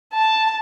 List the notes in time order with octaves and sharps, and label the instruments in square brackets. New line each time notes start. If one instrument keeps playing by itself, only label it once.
[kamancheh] A5